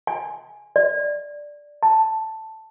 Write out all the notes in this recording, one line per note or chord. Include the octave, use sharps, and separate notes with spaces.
G#5
D5
A5